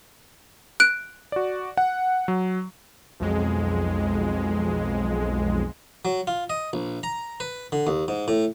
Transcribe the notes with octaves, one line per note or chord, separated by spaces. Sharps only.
F#6 D7
F#4 D5
F#5
F#3
B1 F2 G#3
F#3
F4
D#5
A#1
A#5
B4
D3
D#2
G#2
A2